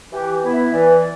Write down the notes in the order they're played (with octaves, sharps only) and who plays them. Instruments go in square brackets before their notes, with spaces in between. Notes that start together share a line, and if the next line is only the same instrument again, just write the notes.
[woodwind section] E3 [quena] G4
[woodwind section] B3 E4
[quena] E5
[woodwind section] E3 [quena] D5